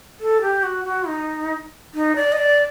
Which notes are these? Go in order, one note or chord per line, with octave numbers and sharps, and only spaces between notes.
A4
G4
F#4
F#4
D#4
D#4
D5
D#5
D5